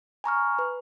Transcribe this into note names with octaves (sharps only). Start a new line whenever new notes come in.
G#5 A#5 C#6 F6
B4